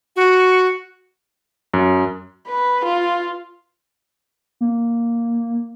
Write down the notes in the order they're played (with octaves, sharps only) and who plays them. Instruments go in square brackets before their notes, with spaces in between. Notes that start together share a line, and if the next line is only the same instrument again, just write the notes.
[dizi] F#4
[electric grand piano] F#2
[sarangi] B4
F4
[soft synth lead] A#3